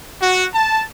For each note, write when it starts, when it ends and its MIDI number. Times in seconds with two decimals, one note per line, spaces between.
0.21 0.46 66
0.53 0.84 81